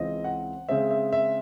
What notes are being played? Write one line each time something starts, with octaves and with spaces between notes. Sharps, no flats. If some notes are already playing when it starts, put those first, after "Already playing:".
Already playing: C#2 C#3 E3 C4 D#5
F#5
C#3 G#3 C4 E5
E5
E5